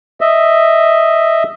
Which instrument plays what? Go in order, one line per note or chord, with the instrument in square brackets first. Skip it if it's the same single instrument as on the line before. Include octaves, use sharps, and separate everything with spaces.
[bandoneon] D#5 E5